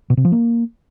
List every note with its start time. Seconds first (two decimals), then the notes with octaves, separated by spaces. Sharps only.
0.10 B2
0.17 C3
0.25 F3
0.32 A#3